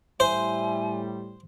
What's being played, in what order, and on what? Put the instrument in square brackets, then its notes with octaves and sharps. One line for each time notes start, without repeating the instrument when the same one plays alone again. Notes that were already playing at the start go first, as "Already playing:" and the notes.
[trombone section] A2 G3 [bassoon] E4 [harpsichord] C5 [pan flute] G#5